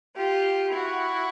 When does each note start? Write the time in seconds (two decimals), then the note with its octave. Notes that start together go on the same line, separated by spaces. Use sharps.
0.16 F4 G4
0.72 E4 F#4